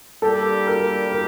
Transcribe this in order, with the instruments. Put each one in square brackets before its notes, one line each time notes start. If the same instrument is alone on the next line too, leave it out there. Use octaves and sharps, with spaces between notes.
[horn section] G3 A#3 D4 G4 [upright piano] A4
[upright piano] A#4
A#4